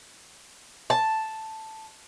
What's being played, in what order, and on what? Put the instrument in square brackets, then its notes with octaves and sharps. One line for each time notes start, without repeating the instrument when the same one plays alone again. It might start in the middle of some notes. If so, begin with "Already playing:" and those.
[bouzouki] A5